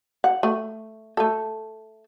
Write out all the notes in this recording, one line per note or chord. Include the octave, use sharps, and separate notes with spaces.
F#5
A3
A3 A4